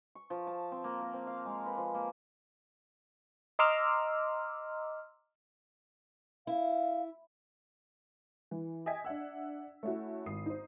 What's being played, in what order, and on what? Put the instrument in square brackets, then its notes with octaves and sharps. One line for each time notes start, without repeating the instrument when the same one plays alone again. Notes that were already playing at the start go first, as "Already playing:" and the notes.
[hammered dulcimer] C#6
F3
A5
C4
A#3
A#4
C4
F5
G#3
B4
F3
A#3
[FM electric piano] D#5 A#5 C6 D6 E6 F6
[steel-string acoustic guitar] E4 [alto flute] F5
[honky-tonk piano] E3
D#5 E5 G5 G#5 G#6 B6
D4 E5 F#5 E6
A3 C#4 E4 F#4
G#1 D#6 C7
D#4 C5